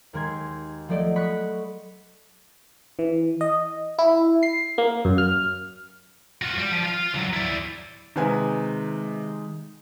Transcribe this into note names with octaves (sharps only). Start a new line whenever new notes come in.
D#2 D#3 G#3 C6 G#6
F3 F#3 A3 A4 D5 D#5
B5 C#6 D#6 F#6 B6 C#7
E3
D#5
E4
C7
A#3
F#2
F6
F4 F#4
G3
F3
F4 F5
D3 F#3
E4 D5
C3 D#3 G#3 B4 G#5